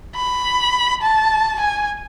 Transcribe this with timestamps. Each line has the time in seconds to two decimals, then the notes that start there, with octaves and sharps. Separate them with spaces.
0.16 B5
1.02 A5
1.60 G#5